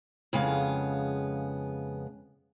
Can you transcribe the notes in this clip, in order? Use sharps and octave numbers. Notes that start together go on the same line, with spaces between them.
F2 C#3 G#3 B3 F5